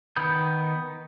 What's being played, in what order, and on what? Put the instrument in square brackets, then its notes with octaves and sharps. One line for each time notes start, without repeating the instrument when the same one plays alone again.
[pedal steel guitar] D#3 B3 B5 D#6 G6